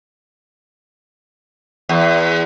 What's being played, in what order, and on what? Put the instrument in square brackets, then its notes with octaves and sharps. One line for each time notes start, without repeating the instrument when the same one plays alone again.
[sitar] E2